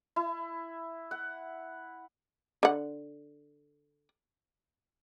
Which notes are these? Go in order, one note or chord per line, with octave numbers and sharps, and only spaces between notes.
E4
F#5
D3 F#5